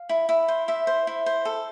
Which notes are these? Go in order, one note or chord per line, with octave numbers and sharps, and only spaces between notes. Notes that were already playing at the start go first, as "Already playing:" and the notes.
Already playing: F5
E4
E4
C5
E4 E5
C5
E4
C5
A4